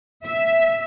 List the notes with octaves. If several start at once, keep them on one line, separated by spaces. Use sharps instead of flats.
E5